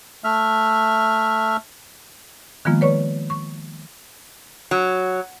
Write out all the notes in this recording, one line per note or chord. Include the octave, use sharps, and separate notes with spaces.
A3 E5 F6
D#3 F3 G#3 A#3 B3 F4
B4 C#5 D5 C#6
C#6
F#3